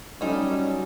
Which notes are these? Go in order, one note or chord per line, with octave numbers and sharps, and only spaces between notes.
F#3 G3 A3 C#4 D#4